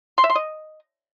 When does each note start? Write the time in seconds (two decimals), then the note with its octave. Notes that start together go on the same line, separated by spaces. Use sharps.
0.18 C6
0.24 E5
0.30 C6
0.35 D#5